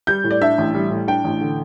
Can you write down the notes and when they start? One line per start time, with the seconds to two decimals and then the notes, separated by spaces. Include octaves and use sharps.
0.07 G3 G6
0.24 A2
0.31 D5
0.41 D4 E5
0.58 A1
0.75 G3
0.91 A2
1.08 D4 G5
1.25 A1
1.41 D3